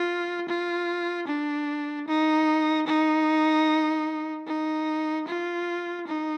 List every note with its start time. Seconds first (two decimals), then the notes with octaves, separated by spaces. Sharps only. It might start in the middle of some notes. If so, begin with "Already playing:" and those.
Already playing: F4
0.48 F4
1.27 D4
2.08 D#4
2.87 D#4
4.47 D#4
5.27 F4
6.07 D#4